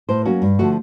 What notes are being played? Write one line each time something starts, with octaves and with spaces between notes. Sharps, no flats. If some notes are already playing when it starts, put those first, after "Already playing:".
A2 C5
F#3 A#3 C#4 F#4
G2
D3 F3 A3 F#4